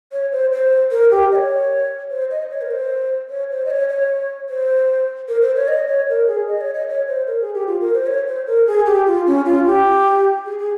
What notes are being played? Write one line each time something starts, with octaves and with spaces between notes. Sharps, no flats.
C#5
C5
C5
A#4
G4
D#5
C#5
C5
D#5
C#5
A#4
C5
C#5
C5
D#5
C#5
C#5
C5
A#4
C5
C#5
D#5
C#5
A#4
G#4
D#5
C#5
D#5
C#5
C5
A#4
G#4
G4
F4
A#4
C5
C#5
C5
A#4
G#4
G4
F4
C#4
F4
G4
G#4
G#4